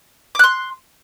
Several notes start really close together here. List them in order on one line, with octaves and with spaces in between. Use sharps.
D6 F#6 C6